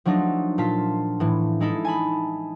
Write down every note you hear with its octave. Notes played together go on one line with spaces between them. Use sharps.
F3 F#3 A3 D4 D#4
A#2 F4 A5 B6
A2 E3
G#3 D#4 E4 A4
G#5 A5 B5